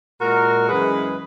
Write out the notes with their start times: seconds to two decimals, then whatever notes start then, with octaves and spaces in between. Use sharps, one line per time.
0.21 A#2 G#3 F#4 A#4
0.69 F#2 E3 G#3 G#4 B4